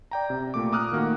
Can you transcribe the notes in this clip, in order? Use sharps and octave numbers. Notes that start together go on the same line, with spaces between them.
D5 G5 A#5
C3
A#2 A3 D6
A#5 D6 D#6 F6 F#6
D#3 A3 A#3 F#4